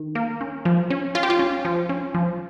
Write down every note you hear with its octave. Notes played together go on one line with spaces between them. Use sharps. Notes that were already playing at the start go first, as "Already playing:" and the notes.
Already playing: D#3
A#3
C#4
F3
C#4
C#4 F4
G4
F4
C#4
F3
C#4
F3